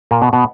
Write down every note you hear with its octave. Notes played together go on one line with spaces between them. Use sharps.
A#2 A#3
B2 B3
B2 B3